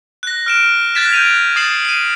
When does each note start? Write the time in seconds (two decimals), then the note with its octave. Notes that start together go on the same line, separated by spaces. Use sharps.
0.23 F#6 A#6
0.46 F6 D7 E7
0.95 F#6 G#6 A6 B6 E7
1.12 G6 D7 D#7 F7
1.56 D#6 A6 C7 E7 F#7
1.85 C7 D#7